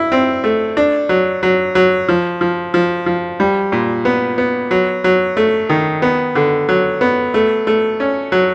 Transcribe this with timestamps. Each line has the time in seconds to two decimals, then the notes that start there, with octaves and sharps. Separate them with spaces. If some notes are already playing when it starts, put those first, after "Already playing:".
Already playing: E4
0.12 C4
0.44 A3
0.77 D4
1.09 F#3
1.43 F#3
1.75 F#3
2.08 F3
2.41 F3
2.74 F3
3.06 F3
3.40 G3
3.72 A#2
4.05 B3
4.38 B3
4.71 F#3
5.04 F#3
5.37 A3
5.69 D#3
6.02 B3
6.35 D3
6.69 F#3
7.01 B3
7.34 A3
7.67 A3
8.00 C#4
8.32 F#3